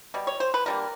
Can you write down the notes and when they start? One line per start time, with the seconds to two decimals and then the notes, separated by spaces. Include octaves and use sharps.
0.14 B2 G3
0.27 C#5
0.40 C5
0.54 B4
0.66 D3 G3 A#3 A#4